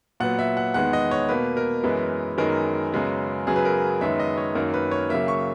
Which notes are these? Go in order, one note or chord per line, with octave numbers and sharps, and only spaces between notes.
A#2 F#3 B3 F#5
E5
F#5
E2 D#3 G#3 B3 F#5
D#5
C#5
B2 A#3 B4
A#4
F#2 E3 G#3 B3
F#2 D#3 G#3 B3 A#4
F#2 C#3 G#3 B3
F#2 C#3 F#3 B3 G#4
B4
A#4
F#2 D#3 G#3 B3 E5
D#5
C#5
F#2 D#3 A#3 A#4
B4
C#5
C#3 F#3 A#3 E5
C#6